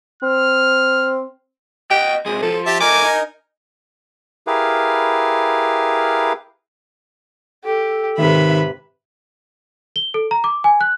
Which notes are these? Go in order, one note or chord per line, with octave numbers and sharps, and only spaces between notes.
C4 F6
D#5 F#5 G5
C3 G#3 G#4
F3 A4
G4 E5 A5
A3 D#4 A#4 G#5 D6
D#4
E4 G4 G#4 A#4 B4 F5
G4 A4
G#2 C3 D#3 B4 E5 B5
G7
A4
A#5
D6
G#5
F#6